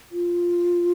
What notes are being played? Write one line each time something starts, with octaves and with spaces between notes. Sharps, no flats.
F4